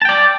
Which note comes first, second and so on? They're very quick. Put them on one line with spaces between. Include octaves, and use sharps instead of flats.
A5 G5 D5